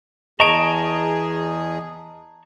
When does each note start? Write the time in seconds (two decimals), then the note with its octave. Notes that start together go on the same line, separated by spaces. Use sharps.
0.40 E2 G#4 D#5 A5 A#5 C#6 D7